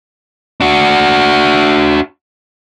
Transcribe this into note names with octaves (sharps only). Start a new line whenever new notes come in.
D4 F#4